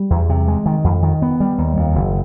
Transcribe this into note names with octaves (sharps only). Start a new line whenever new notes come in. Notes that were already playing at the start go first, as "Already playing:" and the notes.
Already playing: G3
E2
C3
G#3
D#3
F2
D#3
B3
G3
D#2
F2
F#1